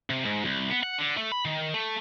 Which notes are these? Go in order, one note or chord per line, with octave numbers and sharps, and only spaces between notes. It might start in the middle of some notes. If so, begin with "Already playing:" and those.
C3
G#2
C2
B3
F#5
D3
A3
B5
D#3
A3